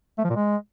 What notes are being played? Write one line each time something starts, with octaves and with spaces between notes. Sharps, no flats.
A3
F3
A#2
G#3